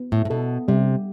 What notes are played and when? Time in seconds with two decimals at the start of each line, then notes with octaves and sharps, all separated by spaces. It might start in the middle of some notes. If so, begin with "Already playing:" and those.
Already playing: B3
0.12 A2
0.25 A2
0.30 B2 A4
0.68 C3 G3